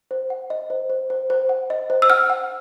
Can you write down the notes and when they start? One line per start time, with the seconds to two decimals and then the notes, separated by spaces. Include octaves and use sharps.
0.11 C5
0.30 F#5
0.50 D#5
0.70 C5
0.90 C5
1.10 C5
1.30 C5
1.49 F#5
1.70 D#5
1.90 C5
2.02 E6
2.10 F#5 F6
2.30 F#5